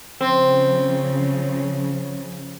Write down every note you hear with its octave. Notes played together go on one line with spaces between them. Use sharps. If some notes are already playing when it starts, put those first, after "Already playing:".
C#3 F3 C4